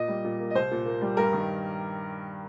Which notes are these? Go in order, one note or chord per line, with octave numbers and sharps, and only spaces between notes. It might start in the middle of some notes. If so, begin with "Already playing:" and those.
Already playing: A#2 D#5
G3
A#2
A#3
D#5
C2 C5
A#2
A#3
G3
G2 A#4
D#3